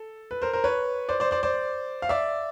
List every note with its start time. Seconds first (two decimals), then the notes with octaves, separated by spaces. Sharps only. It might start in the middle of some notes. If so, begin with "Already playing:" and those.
Already playing: A4
0.31 B4
0.42 A#4 C5
0.53 A#4 C5
0.64 B4 C#5
1.09 C5 D5
1.20 C5 D5
1.31 C5 D5
1.43 C5 D5
2.02 F5
2.09 D5 E5